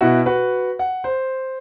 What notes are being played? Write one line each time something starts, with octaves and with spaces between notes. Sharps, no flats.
B2 E4 F#4
F#4 B4
F#5
C5